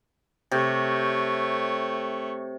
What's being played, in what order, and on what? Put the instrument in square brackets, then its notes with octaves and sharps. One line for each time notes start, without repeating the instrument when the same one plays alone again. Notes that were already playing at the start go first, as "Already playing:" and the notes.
[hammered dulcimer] C3 [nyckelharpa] A3 C#5